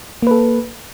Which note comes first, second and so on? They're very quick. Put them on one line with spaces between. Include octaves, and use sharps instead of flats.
A#3 B4 A4